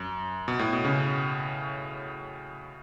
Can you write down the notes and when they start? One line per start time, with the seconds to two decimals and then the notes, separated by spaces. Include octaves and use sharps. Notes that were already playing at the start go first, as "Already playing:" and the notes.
Already playing: F#2
0.48 B2
0.59 A2
0.73 B2
0.85 C#3